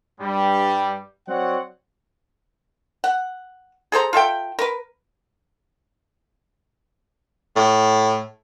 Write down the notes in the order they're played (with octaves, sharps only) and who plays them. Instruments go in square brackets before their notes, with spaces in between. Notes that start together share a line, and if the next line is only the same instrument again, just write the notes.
[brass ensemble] G2 G3
F#3 C4 C#5 D5 F#5
[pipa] F#5
G#4 A4 C5 A#5
F4 A4 E5 G5
A#4 B4
[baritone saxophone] A2